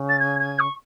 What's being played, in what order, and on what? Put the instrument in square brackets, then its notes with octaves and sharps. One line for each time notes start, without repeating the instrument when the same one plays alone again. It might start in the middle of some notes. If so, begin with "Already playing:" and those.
Already playing: [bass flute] C#3
[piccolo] A6
G#6
G#6
C#6